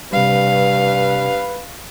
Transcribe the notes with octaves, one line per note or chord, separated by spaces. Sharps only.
G2 C3 G3 B4 F5